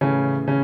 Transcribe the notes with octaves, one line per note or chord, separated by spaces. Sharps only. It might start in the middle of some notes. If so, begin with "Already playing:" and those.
A2 C#3 E3 C#4
C#3 C#4